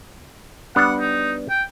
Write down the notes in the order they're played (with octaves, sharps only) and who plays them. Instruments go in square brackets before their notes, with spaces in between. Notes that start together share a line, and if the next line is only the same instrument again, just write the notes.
[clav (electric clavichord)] G3 B3 D4 [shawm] F#5
[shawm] D#4
G5